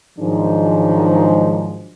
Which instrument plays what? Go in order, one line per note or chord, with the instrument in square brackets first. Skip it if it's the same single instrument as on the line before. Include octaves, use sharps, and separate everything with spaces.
[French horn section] G#2 D#3 F3 F#3 G#3 D4